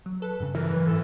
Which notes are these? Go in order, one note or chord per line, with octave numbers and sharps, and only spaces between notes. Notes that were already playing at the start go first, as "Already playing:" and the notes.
F#3
A4 B4
G2 C#3
E3 A#4
G#2 F#3 B4
G#2 C3 A4